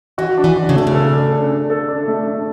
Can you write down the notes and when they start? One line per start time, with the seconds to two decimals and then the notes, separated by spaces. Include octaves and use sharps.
0.18 E3 F#4
0.38 D4
0.44 E3
0.56 F#4
0.69 C#3
0.76 B2 A3
0.87 C#3
0.95 A4
1.13 D4
1.32 A4
1.51 D4
1.70 A4
1.89 D4
2.08 A3
2.27 D4